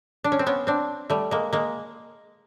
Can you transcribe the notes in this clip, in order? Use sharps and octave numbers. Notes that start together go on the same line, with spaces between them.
D4
C#4
C4
B3 C#4
C4 D4
G3 A3
G#3 A#3
G#3 A#3